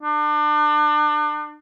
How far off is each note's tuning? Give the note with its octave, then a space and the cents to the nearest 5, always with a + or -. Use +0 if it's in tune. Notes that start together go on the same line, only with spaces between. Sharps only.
D4 +35